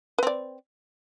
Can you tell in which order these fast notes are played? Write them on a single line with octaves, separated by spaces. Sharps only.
B4 C4 D5